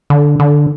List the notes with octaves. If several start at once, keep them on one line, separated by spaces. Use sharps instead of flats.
D3
D3